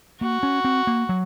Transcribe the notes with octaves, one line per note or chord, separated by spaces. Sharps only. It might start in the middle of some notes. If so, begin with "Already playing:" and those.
A#3 F#4
C#4
C4
A#3
F#3